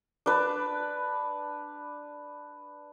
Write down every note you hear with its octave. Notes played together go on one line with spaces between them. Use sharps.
D4 B4